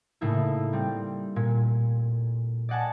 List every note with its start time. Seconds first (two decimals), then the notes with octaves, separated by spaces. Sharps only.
0.21 A2 C#3 A3 A#3 D#4 E4
0.73 G3 C4
1.36 A#2
2.69 D5 D#5 F#5 G#5 A5